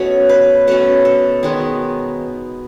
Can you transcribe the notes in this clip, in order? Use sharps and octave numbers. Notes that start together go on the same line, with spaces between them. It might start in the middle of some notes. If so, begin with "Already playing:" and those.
Already playing: B2 A3 C#4 C#5
B4
B2 A3 C#4 A4
A4
D#3 G#3 B3 G#4